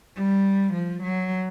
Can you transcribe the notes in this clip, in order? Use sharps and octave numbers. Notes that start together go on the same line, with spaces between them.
G3
F3
F#3